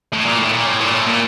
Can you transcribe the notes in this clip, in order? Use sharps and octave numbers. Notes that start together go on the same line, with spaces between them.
A2
A#2
A2
A#2
A2
A#2
A2
A#2